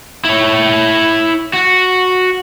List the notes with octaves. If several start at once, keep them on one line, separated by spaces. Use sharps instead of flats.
E4 C#5
F#4